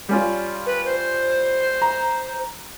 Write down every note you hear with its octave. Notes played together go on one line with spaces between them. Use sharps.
G3 C#4 F4
B4
C5
A#5